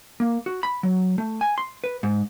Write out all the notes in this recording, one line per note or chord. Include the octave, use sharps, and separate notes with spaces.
A#3
F#4
B5
F#3
A3
G#5
C6
B4
G#2